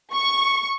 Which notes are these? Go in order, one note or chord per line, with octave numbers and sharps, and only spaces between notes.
C#6